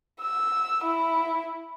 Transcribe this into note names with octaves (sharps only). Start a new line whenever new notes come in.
E6
E4